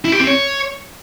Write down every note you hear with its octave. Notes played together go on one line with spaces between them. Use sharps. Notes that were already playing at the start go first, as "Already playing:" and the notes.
E4
G4
C4
C#5